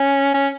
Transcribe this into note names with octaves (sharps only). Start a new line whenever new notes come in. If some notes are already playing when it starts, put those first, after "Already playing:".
Already playing: C#4
C#4